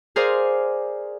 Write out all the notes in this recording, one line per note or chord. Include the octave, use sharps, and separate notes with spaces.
G#4 A#4 C5 D5 F5 G#5